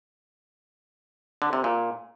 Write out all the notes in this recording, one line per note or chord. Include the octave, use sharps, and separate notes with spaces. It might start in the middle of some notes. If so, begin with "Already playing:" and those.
D3
C3
A#2